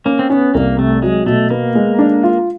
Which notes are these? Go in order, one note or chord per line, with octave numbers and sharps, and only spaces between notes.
A#3 C#4
C4
B3 C#4
C2 A#3
C3 A3
F#3 G#3
B2 A3
A#3 B3
G#3
D4
F4